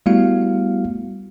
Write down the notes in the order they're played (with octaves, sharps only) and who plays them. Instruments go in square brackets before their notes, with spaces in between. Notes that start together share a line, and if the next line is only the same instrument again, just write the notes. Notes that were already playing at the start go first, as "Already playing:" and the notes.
[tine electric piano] G3 A3 B3 E4 F#4 F5